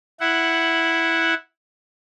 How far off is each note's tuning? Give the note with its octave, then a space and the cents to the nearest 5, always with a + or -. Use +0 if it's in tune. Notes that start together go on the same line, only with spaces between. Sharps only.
E4 +0 F#5 +0